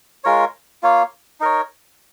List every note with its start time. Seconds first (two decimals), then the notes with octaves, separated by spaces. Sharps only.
0.24 G#3 F4 A#4 C#5
0.83 A#3 F4 C#5 F5
1.40 D#4 A#4 C#5